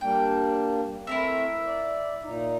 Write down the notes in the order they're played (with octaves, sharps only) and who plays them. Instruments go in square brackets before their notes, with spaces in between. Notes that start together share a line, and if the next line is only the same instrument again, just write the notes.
[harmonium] G3 A#3 D4 [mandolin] G5
[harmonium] A3 C4 [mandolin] E4 A#4 E5
[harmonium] D5
A#2 D#4